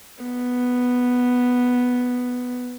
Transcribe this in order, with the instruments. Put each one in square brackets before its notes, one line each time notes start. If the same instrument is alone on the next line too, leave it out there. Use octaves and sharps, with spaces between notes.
[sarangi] B3